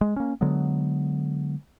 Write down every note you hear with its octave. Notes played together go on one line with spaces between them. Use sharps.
G#3
A#3 C#4
D3 F#3 G#3 B3